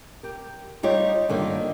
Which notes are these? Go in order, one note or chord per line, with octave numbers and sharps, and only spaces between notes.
G4 A#4
G3 D#4 F4 G4 C#5
G2 D3 D#3 A#3